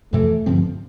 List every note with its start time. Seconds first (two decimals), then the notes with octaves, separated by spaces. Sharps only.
0.13 F2 C3 E3 A3
0.46 G2 D3 F3 C4